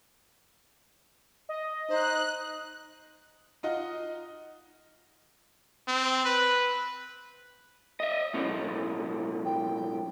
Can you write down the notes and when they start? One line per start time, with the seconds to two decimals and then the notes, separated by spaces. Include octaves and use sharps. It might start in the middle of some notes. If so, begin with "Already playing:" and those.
1.49 D#5
1.89 D#4 C5 F#6
3.63 D#4 F4 D#5 F#5
5.88 C4
6.25 B4
8.00 D#5 E5
8.34 B1 A2 C#4
9.45 G5